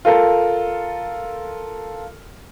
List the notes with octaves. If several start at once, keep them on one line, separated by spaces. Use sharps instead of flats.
F4 A4 A#4